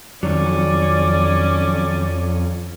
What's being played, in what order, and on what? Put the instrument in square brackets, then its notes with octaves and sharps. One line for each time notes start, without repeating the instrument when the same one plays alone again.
[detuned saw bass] F2 [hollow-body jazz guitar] D#3 F#3 [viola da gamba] C#4 [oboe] D5